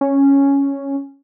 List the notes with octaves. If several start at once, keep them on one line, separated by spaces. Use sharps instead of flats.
C#4